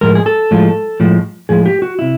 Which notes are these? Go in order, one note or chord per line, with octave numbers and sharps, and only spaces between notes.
A2 F3 G#3 A#4
G#4
A4
A2 F3 G#3
A2 F3 G#3
A2 F3 G#3 G#4
G4
F#4
C3 E4